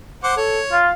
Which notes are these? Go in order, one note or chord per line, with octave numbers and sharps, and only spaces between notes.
C5 F#5 D6
A4 C#5
F4 F5